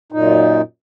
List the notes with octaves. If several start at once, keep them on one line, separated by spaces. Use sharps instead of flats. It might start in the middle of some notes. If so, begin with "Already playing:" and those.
F#2 A#2 D#4